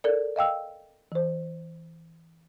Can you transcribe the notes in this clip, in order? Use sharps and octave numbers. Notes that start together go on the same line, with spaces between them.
A4 A#4 D5
D#5 F5 G5 E6
E3 C5